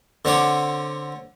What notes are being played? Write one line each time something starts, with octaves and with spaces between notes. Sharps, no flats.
D3 C4 C#5 D6